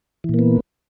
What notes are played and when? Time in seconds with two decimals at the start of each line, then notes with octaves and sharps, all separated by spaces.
0.24 E3
0.29 A#2
0.34 A#3
0.39 B3